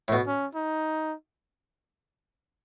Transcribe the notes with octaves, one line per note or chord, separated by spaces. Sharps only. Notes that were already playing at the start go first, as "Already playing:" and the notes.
A2
B2
C#4
D#4